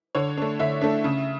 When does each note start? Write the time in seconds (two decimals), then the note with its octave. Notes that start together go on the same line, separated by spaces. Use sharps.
0.15 D3 C#5
0.37 A3 D4
0.59 D3 E5
0.82 A3 D4
1.04 C#3